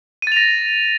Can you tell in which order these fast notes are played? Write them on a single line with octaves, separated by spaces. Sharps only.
D#7 A6 F7 A#6